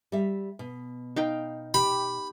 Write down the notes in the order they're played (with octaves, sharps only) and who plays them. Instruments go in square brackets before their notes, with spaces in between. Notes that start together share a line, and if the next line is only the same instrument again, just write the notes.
[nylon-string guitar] G3 E5
B2
[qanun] D#4 F5 G5
[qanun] G4 [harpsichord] B5